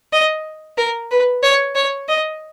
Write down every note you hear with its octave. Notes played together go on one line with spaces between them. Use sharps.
D#5
A#4
B4
C#5
C#5
D#5